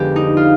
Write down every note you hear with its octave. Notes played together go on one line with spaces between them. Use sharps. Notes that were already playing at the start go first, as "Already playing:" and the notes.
Already playing: F2 D3 G#3 B3 G4
D#4
F4